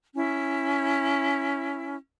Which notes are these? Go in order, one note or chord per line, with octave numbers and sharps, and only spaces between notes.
C#4 E4